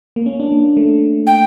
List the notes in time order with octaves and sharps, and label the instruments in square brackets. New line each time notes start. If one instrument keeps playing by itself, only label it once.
[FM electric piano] A#3
C#4
D4
A#3
A3
[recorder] G5